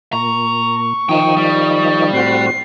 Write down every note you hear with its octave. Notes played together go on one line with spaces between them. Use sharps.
A#2 A#5 C#6
D#3 F3 D#4 G5 A#5
G3
A2 C4 F#4 C7